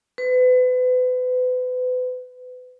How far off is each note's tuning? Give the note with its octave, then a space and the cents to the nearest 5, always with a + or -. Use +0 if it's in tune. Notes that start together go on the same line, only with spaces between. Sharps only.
B4 +35